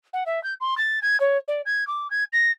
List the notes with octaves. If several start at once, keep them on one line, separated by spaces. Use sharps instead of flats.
F#5
E5
G6
C6
A6
G#6
C#5
D5
G#6
D6
G#6
A#6